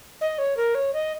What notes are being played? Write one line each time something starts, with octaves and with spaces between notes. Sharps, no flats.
D#5
C#5
A#4
C#5
D#5